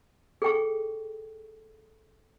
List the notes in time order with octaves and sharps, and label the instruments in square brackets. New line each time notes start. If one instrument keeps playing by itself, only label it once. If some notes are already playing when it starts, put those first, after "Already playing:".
[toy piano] G#4 A4 G5 C#6